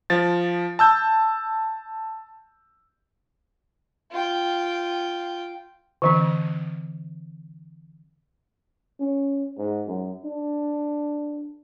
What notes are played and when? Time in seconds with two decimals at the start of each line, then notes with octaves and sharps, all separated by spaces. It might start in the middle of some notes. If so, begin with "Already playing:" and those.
0.10 F3 A6
0.79 A5 E6 G6
4.12 F4 G5
6.02 D3 E3 C4
9.00 C#4
9.58 G#2
9.87 F#2
10.25 D4